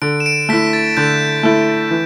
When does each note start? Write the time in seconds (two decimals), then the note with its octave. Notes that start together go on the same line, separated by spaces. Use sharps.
0.02 D3 D7
0.20 E7
0.26 D7
0.49 A3 E4 B6
0.73 A6
0.97 D3 G6
1.43 A3 E4
1.91 E3